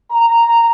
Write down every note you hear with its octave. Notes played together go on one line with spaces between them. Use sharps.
A#5